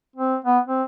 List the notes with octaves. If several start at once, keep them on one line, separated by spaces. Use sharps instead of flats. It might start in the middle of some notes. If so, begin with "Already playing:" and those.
C4
B3
C4